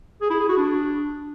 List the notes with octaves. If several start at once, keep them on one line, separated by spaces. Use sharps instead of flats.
G#4
E4
G#4
F#4
D4